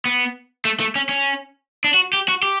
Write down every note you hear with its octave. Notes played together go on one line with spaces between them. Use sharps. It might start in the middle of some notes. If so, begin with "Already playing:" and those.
B3
A3
A3
C#4
C#4
D4
F#4
G4
F#4
G4